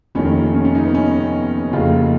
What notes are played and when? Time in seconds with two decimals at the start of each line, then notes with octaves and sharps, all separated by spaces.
0.15 F1 D#2 D#3 C#4
0.55 C#4
0.65 C#4
0.75 D#4
0.85 B3
0.94 C#4
1.73 F1 D#2 C#3 F4